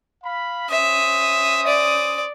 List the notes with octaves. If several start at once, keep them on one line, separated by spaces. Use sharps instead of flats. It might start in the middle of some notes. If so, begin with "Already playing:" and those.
F5 B5
C#4 C5 E5 D#6
D5